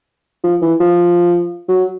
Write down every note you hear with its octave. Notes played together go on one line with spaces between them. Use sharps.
F3
E3
F3
F#3